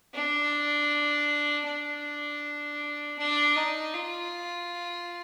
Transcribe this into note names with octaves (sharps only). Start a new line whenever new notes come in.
D4
D4
D4
D#4
F4